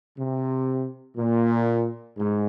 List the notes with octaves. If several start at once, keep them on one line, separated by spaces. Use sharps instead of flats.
C3
A#2
G#2